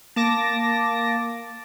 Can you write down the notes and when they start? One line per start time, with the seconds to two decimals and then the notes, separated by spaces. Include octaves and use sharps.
0.16 A#3 A5 D6 A#6